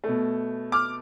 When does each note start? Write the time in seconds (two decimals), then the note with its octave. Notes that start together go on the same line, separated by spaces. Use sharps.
0.04 B2 A3
0.72 D6 F6